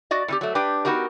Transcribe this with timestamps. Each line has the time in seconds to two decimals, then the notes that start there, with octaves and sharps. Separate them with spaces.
0.11 F#4 D5 D#5
0.28 A2 C4 G4
0.41 F#3 A3
0.55 D4 G4 B4 G5
0.85 B3 D#4 F#4 G4 A#4